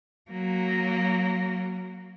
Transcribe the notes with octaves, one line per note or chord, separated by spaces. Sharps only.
F#3 A#3